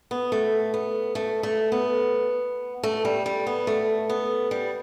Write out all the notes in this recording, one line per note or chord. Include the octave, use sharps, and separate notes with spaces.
B3
A3
B3
A3
A3
B3
A3
G3
G3
B3
A3
B3
G3